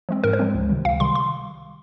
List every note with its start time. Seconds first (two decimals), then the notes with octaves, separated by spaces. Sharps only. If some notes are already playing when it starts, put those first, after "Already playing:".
0.09 F3 G#3 C4
0.24 G#2 A#4
0.33 C5
0.39 F3 G#3 C4
0.54 C#2
0.69 C3 D#3 G3
0.85 C#2 F5
1.00 C3 D#3 G3 C6
1.15 C6